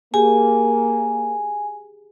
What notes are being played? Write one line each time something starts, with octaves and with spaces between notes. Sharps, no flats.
A#3 G4 G#4 G#5